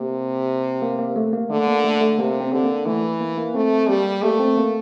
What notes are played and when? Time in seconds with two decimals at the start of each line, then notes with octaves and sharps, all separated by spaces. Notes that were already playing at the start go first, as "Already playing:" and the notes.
Already playing: C3 A#3
0.82 A#3
0.99 A#3
1.16 A3
1.33 A#3
1.50 D3 A3
1.67 A#3
1.84 A3
2.01 A3
2.18 C3 A#3
2.41 C4
2.52 D3
2.64 A#3
2.86 E3 A3
3.21 A#3
3.38 A#3
3.55 A3 C4
3.89 G3 A#3
4.23 A3 A#3
4.40 C4
4.57 A#3